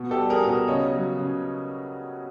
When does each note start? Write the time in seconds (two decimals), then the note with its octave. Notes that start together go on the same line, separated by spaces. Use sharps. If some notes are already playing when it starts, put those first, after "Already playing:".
Already playing: B2
0.11 G4 A4
0.18 G3
0.30 G#4 A#4
0.43 B2
0.49 G#4 A#4
0.68 C#3 C#5 D#5
0.94 F#3
1.19 C#3